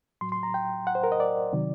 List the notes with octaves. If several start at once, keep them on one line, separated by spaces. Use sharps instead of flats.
A2 F#3 C6
C6
A#5
G5
F#5
C5
A#4
D#5
D5
C3 D#3 F#3